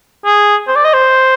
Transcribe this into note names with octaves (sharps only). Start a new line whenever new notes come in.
G#4
C5
D5
D#5
C5